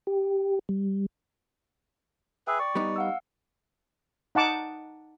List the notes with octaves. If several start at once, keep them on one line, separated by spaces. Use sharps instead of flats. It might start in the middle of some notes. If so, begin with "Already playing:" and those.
G4
G3
G#4 B4 E5 G5
D5 C#6
G3 B3 D#4
F5 F#5 E6
D#4 F#5 A5 D6